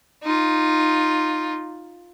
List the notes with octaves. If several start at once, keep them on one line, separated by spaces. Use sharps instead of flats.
D#4 F4